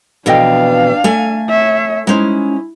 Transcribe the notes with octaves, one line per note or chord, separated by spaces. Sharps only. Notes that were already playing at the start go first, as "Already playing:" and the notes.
F2 B2 E3 D4 A4 D#5 F5 G5
A3 G#5
C#5 E5
G#3 C#4 D#4 E4 C5